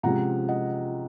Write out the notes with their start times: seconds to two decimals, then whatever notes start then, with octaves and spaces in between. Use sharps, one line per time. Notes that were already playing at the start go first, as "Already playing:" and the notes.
0.03 C3 F3 G#3 C#4 F#5 A#5
0.48 D#5 F#5